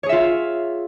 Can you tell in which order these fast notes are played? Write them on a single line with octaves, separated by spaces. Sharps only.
C#5 G#4 E5 F4